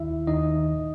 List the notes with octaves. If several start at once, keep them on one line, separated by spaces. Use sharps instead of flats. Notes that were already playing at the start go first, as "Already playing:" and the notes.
Already playing: D#2 D#3 E4 E5
D#2 D#3 D#4 D#5
A#2